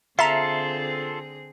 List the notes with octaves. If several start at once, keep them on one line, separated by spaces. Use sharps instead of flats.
D3 C4 F4 G#4 A4 E5 A#5